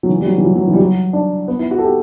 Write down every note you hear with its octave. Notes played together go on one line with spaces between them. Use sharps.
F#3
E3
G3
F#3
E3
F#3
F#3
E3
G3
F#3
D4
B3
E4
F#4
A4
G4